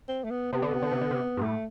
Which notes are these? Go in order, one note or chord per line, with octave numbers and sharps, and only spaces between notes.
C4
A3
B3
C3 B3
D3
C3
D3
C3
D3
C3
G2
A2 A3